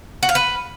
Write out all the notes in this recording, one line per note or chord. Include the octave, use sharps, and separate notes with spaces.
F#4
F5
B4